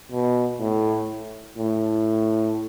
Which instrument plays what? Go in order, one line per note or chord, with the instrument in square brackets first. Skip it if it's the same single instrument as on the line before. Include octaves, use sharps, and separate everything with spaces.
[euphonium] B2
A2
A2